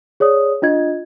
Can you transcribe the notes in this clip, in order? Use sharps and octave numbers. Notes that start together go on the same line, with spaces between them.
G#4 C#5 D5 D#6
D4 F4 D#5 G#6